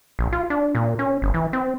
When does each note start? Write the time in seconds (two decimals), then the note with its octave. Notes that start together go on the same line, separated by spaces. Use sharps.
0.19 A#1
0.32 F4
0.50 D4
0.75 A#2
0.99 C#4
1.22 G1
1.34 E3
1.53 C4